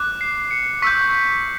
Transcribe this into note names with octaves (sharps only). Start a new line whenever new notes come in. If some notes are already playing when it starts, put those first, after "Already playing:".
Already playing: D6 F#6
C7
C#7
C#6 E6 G6 B6